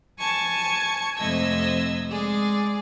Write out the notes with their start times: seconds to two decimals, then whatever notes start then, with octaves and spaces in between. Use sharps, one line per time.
0.19 G#5 A5 C#6 G#6
1.18 F2 C3 A3 D#5 E6 G#6
2.10 G#3 G#4 D5